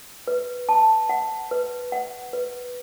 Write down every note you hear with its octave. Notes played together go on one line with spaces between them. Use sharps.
B4
A5
F#5
B4
F#5
B4